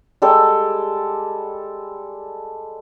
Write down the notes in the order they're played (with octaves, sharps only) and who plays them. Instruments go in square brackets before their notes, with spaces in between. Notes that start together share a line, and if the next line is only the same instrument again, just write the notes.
[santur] G3 G#3 A4 G5